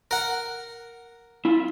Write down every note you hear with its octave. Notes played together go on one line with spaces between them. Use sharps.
A#4 F#5
E4 F4